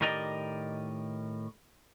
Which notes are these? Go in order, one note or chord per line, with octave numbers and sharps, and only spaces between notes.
A2 D#3 G4 A#4 D5 D#5